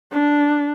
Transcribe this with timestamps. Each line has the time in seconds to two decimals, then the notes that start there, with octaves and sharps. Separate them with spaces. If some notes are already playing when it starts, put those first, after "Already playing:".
0.12 D4